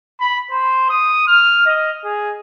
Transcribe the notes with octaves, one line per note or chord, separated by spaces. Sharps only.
B5
C5
D#6
F6
D#5
G#4